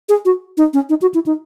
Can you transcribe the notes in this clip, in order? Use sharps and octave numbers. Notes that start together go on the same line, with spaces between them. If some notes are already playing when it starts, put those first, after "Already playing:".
G#4
F#4
D#4
C#4
D#4
F#4
E4
D#4